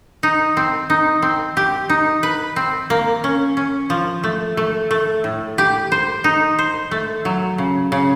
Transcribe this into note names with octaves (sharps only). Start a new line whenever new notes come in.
D#4
C4
D#4
C4
G4
D#4
B4
C4
A#3
C#4
C#4
F3
A3
A3
A3
A2
G4
C5
D#4
C5
A3
F#3
C#3
C#3